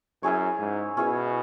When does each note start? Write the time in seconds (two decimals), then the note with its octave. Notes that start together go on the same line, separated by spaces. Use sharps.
0.23 F#2 C#4 E4 G#4 C#5
0.60 G#2
0.97 B2 C#4 E4 G#4 C#5